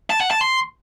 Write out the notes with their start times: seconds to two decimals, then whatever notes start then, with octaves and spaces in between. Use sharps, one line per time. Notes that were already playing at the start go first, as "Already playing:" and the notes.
0.10 A5
0.20 F#5
0.31 A5
0.41 C6